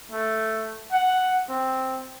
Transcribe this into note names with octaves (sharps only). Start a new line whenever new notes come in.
A3
F#5
C4